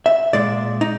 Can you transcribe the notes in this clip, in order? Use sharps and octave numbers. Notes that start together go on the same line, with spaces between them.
E5
A#2 G#3 D5
D#4